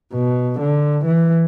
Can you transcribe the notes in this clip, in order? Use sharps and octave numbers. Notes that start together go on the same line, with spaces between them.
B2
D3
E3